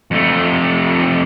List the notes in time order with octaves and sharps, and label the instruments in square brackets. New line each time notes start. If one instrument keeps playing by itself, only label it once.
[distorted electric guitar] F2 A3